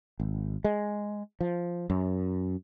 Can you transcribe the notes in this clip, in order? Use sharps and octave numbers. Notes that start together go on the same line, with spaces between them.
G#1
G#3
F3
F#2